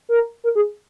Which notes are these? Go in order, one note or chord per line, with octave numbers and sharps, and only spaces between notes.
A#4
A#4
G#4